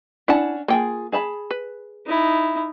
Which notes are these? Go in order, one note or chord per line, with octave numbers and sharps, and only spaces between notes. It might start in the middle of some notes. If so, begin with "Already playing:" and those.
C#4 D4 E4 F#5 A5
A#3 F4 G#4 G5
G#4 A5 B5
B4
D#4 E4